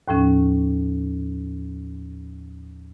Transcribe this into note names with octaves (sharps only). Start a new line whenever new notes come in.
D#2 A2 F3 C#4